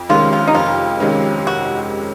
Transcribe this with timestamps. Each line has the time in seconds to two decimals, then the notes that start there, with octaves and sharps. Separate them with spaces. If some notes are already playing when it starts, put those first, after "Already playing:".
Already playing: F2
0.09 C3 D#3 G#3 C#4 F4
0.33 F4
0.48 D#4
0.55 F2 F4
1.00 C3 D#3 G#3 C#4
1.47 F#4